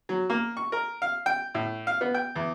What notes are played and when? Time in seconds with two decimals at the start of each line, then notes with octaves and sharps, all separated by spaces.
0.09 F#3
0.30 A#3
0.57 C#6
0.72 A#4
1.02 F5
1.26 G5
1.55 A2
1.87 F5
2.01 B3
2.14 G5
2.36 E2